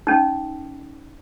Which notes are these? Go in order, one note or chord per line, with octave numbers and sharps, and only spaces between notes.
C#4 D#4